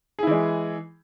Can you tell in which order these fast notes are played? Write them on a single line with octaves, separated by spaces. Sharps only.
G#4 E4 E3 G#3